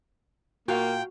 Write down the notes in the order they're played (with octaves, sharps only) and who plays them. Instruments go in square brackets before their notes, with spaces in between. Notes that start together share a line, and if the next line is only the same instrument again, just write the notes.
[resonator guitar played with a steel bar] A#2 F5 [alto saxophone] A#3 [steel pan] F#4 [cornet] G5